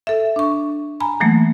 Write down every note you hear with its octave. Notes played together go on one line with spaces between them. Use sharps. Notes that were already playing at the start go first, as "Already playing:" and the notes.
A4 E5
D4 C#6
G#5 A#5 B5
E3 F#3 A3 A#3